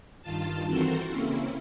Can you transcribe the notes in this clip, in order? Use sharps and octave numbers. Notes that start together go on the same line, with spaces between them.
G2 D#3 F4 A5
E3 C4 F#4 A4 A#4 C5
C#3 A#3 C4 C#4 E4